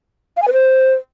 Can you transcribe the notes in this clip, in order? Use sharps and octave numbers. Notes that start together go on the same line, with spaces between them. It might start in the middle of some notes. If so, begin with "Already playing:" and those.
F5
G#5
B4
C5